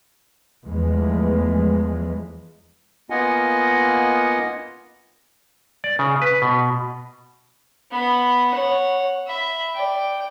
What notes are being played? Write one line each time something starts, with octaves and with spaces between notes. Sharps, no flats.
E2 E3 F3 G#3 A3
A#3 B3 F4 D#5 F#5 G#5
D5
C#3
B4
B2
B3 B5
C#5 F#5
E5 B5
D5 G5